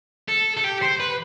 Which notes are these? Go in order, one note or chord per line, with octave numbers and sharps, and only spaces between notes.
A4
A4
G4
C5
B4